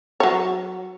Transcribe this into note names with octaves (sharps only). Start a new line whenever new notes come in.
F#3 C#5